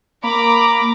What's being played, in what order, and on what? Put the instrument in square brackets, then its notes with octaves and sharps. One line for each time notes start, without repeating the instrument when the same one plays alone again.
[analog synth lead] A#3 [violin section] A#5 B5 D6